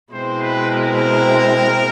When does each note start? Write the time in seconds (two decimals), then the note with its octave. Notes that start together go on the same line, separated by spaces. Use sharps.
0.11 B2 G#3 C4 E4 C5
0.42 B4
0.71 A#4